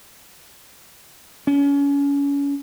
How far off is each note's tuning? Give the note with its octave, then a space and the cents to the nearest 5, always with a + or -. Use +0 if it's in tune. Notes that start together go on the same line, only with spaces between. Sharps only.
C#4 +30